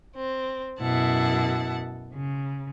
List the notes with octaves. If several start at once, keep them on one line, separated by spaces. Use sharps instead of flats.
C4
F#2 B2 E4 F#5 A5
C#3